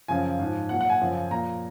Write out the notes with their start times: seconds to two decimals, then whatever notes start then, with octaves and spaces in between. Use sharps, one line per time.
0.08 F#2 C#3 F3 G#5
0.39 G#2 F3
0.69 A#2 F#3 F#5
0.81 F#5
0.90 G#5
1.00 F#2 C#3 F3
1.31 A#2 F3 A#5